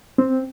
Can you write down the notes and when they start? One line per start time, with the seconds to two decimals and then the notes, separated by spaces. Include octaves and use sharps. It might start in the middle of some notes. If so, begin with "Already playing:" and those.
0.18 C4